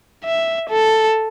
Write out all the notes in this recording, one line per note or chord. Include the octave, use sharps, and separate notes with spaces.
E5
A4